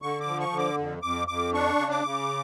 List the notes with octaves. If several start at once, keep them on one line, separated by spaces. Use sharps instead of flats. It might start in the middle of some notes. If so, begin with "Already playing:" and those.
D3 C#6
D6
F3
C#6
D3
D6
F2
F2 D6
F2 D6
D4 C#6
C#3
D6
C#3